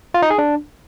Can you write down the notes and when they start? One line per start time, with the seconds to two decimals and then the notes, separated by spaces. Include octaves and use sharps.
0.14 F4
0.22 D#4
0.30 G#4
0.38 D4